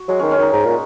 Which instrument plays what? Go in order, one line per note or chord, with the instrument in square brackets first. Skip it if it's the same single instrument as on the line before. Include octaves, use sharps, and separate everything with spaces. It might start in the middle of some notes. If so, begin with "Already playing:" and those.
Already playing: [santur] F#4
[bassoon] F#3 [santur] G#3
[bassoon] D#3 [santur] C#4
[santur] C#4
[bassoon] D#3 [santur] D#4
[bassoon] G#2 [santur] D#4
[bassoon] A#2